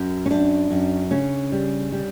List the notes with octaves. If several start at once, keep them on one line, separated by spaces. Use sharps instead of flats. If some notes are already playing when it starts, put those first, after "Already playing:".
Already playing: F#2
C#4
F#2 D4
F#2
C#3 C#4
G3
G3